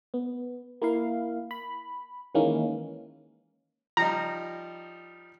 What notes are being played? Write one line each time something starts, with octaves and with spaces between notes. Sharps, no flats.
B3
A#3 E4 F5
B5
D#3 E3 G#3 A#3 C#4
F3 G3 D#4 A#5